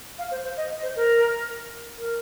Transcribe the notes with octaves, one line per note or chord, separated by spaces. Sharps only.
F5
C5
C5
D#5
C5
A#4
A#4